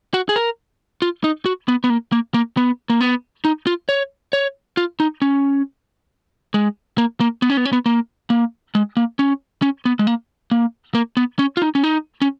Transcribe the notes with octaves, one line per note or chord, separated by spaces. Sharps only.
F#4
G#4
A#4
F4
D#4
F#4
B3
B3
A#3
A#3
A#3
B3
A#3
B3
D#4
F4
C#5
C#5
F4
D#4
C#4
G#3
A#3
A#3
B3
C#4
B3
C#4
B3
A#3
A#3
G#3
A#3
C#4
C#4
B3
G#3
A#3
A#3
A#3
B3
C#4
F4
D#4
C#4
D#4
C#4